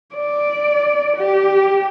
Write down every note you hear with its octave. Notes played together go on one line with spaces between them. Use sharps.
D5
G4